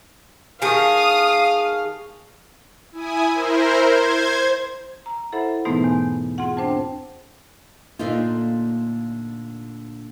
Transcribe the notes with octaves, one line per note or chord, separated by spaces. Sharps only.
D#3 G#4 F5 G#5 A5 C#6 D#6
E4 G#5 D#6
E4 A#4 C5
C5 G#6
A#5
E4 A4 C5 E5 F#5 B5
G#2 B2 E3 A3 B3 D#4
E2
C4 F4 G#4 F#5
D4 C5 G5 A5
A#2 D3 A3 A#3 D#4 F4